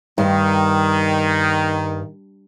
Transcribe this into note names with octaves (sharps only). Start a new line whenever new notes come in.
G2 D#3